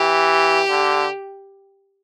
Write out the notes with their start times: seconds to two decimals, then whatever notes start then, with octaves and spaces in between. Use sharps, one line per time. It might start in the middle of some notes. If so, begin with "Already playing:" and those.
Already playing: E3 G4
0.70 D3